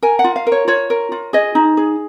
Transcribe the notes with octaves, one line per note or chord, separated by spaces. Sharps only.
A#4 G#5
F#5
F4
F5
A#4
C#5
F4 C#5
A#4
F4
G#4 D#5
D#4
G#4